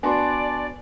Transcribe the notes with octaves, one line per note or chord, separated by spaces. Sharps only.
B3 D4 F#4 D5 G#5 A5 C6